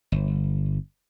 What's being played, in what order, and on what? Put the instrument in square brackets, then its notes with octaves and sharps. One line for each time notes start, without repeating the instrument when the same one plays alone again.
[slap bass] G1